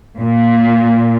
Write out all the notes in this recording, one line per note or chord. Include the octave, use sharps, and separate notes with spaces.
A#2